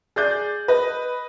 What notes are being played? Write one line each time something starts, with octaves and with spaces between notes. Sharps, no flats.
G#4 D5 G6
B4 D#5